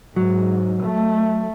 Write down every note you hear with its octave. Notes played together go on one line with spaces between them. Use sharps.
G#2 F#3
A3